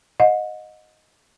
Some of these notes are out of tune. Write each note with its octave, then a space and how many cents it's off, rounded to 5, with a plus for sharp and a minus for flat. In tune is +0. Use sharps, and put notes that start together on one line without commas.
D#5 +0 F#5 -35